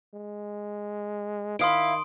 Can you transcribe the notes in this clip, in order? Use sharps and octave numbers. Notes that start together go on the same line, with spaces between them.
G#3
D#3 E4 F5 C6 D#6 D7